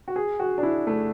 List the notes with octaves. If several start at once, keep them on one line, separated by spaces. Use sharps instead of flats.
F#4
G#4
F#4
D4
E4
A3